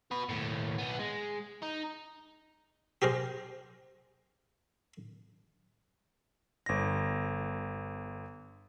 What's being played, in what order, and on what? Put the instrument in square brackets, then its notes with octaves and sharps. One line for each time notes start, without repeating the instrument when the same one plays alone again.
[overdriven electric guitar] F#4 B4
D#2 A2
F#3 B3
G#3
D#4
[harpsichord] G4 G#4 A#4 C5
[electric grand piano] G1 A#6